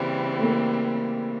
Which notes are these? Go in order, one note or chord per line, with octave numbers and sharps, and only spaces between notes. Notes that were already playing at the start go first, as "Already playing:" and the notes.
Already playing: C#3 E3 G3 A#3 C4
A3
A#3